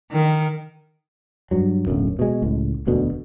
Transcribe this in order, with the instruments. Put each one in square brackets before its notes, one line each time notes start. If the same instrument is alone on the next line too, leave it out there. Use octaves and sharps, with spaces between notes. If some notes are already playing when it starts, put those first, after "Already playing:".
[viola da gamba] D#3
[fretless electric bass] G2 F#3
D1 B1 F#2
B2 G#3
C#2 A2
E1 D2 B2 D3